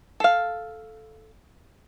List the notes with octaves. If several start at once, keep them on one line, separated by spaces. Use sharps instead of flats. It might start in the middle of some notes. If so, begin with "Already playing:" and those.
A4 F5